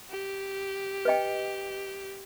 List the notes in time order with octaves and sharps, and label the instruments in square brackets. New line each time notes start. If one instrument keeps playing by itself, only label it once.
[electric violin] G4
[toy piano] B4 D#5 G5